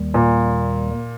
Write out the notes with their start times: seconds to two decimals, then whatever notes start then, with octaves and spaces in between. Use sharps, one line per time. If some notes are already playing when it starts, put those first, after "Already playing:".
Already playing: D#2 D#3 G3
0.14 A#2